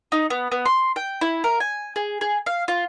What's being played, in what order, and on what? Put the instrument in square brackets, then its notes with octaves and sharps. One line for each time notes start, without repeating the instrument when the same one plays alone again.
[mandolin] D#4
B3
B3
C6
G5
E4
A#4
G#5
G#4
G#4
F5
F4